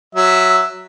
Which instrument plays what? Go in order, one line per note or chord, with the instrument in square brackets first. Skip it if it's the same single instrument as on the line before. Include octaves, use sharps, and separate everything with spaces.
[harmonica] F#3 E5